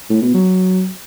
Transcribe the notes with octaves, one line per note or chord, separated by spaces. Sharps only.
A2
B2
F#3